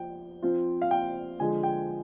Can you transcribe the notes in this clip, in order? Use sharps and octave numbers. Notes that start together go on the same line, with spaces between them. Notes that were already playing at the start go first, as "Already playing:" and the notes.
Already playing: F3 G5
F3 C4 F4
F5
G5
D3 F3 G#3 G#5
G5